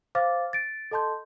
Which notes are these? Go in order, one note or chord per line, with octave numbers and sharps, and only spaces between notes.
C5 F5 D6 F6 A6
A6 D7
A4 D#5 A5 C6 G6